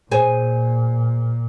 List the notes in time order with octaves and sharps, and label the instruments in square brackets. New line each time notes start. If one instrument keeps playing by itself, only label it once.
[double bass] A#2 [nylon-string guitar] G#4 C5 G#5